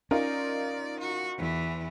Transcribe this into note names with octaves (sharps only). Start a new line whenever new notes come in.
C#4 D#4 F4 A#4 D5
F#4
E2 E3